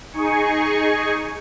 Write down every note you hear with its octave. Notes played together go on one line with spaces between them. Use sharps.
D#4 G#4 G#5 C#6